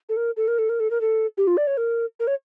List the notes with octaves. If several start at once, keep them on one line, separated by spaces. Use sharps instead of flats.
A4
A#4
A4
A#4
A4
A#4
A4
A#4
A4
G4
F4
D5
C#5
A#4
A#4
C#5